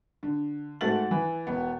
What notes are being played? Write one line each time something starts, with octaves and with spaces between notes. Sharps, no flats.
D3
G#2 A3 F#4 A6 F#7
E3
E1 B3